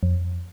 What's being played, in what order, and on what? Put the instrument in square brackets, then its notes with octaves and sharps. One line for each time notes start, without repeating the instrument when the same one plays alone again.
[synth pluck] F2